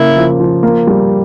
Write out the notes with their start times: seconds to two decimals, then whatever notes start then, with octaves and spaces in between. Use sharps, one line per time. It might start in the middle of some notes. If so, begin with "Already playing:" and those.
Already playing: C#3 A#3 E4
0.17 F3
0.40 F3
0.63 A#3
0.87 G3